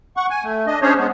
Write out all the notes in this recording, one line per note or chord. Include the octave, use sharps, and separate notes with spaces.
F#5 C#6
G#5
A3
D4 D#5
C#4 D4 G#4 C5 C#5
G#3 B3